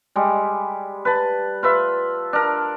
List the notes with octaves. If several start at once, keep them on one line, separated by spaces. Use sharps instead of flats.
G3 G#3
B4 A5
F4 B4 E5
D4 A#4